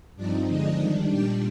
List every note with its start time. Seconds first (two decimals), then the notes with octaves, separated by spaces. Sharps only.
0.16 G2 F3 C4 D4 D#4 D5
0.48 D3 F3 G#3 D4 D#4 D#5
0.79 D#3 G3 D4
1.11 A#2 G3 D4 G4 G5